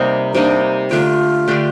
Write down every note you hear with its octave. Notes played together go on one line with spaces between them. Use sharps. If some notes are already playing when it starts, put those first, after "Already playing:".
Already playing: C3 G3 A#3 D#4
C3 G3 A#3 D4 D#4
D3 A3 D4 F4 G4
D3 A3 D4 G4